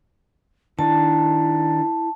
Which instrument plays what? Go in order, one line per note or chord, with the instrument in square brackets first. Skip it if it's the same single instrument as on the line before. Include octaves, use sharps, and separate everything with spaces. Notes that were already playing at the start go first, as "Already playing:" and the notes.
[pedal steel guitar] D#3 D4 [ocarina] E4 [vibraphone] A5